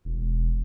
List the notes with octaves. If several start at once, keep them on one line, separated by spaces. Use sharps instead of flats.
E1